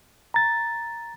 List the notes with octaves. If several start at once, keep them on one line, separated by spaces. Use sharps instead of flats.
A#5 A6